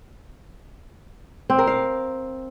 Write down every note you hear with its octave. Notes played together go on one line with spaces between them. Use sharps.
C4
A#4
F5